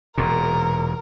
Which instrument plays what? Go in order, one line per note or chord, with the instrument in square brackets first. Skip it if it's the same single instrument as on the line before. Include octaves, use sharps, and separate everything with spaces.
[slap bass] E1 A#2 [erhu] A#4